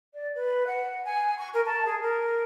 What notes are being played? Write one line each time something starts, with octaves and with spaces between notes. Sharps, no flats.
D5
B4
F#5
G#5
C#6
A#4
A5
G#4
A#4